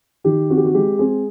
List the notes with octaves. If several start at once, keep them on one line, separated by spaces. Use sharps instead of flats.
D#3 G4
C4 F#4
G4
F#4
G#3 G4
C4 G#4